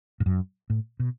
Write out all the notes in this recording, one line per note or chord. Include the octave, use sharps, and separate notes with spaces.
G#2
F#2
A2
B2